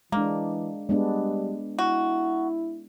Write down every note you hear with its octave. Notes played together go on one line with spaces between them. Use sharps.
E3 G#3 A#3 D4
G3 G#3 B3 D4
E4 F#4